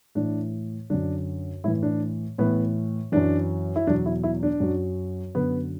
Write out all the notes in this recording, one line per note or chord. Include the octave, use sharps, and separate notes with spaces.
A2 E3 D4
F#2 D3 F#3 D4
A2 E3 E4
D4
A2 E3 B3
F#2 E3 D4
E4
E2 B2 F#3 D4
E4
E4
D4
F#2 F#3
F#2 D3 F#3 B3